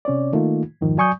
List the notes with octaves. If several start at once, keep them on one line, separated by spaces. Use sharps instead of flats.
C3 C#4 C#5 D5
D#3 A3 A#3 D#4 F4
F2 G#2 D#3 F3
F#3 D5 G#5 C#6 D#6 G6